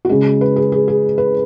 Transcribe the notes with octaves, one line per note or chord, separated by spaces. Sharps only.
F#4
C#3 G#3 G#4
B4
G#4
G#4
G#4
B4